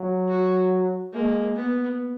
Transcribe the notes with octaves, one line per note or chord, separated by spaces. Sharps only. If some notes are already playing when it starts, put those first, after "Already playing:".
Already playing: F#3
F#4
G#3 A#3
B3